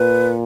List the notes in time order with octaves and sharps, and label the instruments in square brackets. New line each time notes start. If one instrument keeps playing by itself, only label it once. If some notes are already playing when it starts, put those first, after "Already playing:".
Already playing: [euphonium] A#2 [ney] B4